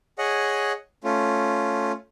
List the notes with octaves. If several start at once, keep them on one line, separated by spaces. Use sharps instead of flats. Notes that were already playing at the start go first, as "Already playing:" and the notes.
G#4 C#5 D#5 F#5
A3 C#4 F4